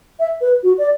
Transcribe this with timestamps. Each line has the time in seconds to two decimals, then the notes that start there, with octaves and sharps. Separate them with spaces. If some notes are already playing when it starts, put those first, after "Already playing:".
0.19 E5
0.41 B4
0.63 F#4
0.78 D5